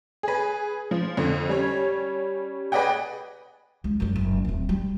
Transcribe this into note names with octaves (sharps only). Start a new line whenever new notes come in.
G#4 B4
F3
F2 D3
G3 C#4 C#5
G#4 B4 D5 D#5 F#5 G5
C#2
F#2 G3
F#1
D1 C4
G3